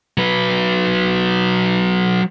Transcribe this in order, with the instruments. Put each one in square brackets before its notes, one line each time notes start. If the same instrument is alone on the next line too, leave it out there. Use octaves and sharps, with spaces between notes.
[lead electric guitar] F#3 B4